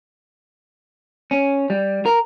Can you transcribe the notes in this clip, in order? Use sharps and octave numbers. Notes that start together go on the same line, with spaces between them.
C#4
G3
A#4